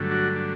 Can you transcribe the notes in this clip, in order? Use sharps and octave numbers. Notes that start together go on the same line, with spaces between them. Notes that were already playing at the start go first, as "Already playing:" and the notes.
Already playing: G2 D3 F#3 A3
D4 F#4
D4